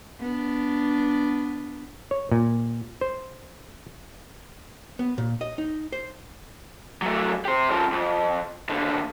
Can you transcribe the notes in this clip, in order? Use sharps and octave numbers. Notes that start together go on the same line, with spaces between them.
B3 D4
C#5
A#2
C5
B3
A#2
D#5
D#4
C5
F#3 A3
G4 C5
F3 C#4
F2
D#2 D3